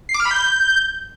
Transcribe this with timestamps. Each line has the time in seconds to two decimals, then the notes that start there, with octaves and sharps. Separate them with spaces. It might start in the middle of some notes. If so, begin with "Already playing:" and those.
0.09 C7
0.14 D6
0.20 F6
0.25 B5
0.31 G6